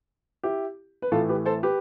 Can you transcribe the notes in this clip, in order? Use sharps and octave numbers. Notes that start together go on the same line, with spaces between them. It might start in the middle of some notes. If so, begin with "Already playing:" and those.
E4 G4
B4
A2 E3 A3 F4 A4
G4 B4
A4 C5
G4 B4